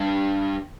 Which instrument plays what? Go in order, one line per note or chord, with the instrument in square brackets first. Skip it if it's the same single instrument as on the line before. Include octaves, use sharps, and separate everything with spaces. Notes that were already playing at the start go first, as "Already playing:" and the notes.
Already playing: [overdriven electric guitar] G2